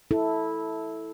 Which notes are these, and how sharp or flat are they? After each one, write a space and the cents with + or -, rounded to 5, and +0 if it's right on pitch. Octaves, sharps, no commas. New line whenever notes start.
E4 -10 A4 +0